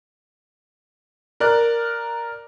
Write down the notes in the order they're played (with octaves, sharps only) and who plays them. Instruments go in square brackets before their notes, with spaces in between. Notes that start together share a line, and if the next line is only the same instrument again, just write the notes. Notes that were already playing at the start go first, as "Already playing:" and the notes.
[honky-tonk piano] A#4 D5 F#6